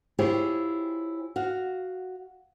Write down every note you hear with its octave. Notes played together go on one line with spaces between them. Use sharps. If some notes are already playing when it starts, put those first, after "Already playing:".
E4 F4 G4 G#4 C5 C#5
F#4 F5